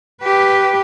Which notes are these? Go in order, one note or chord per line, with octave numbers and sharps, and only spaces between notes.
G4 B4